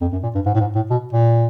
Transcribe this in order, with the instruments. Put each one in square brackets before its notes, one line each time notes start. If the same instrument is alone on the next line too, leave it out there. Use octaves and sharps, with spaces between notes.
[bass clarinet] F2
F#2
A#2
G2
G#2
A2
G#2
A2
B2
A#2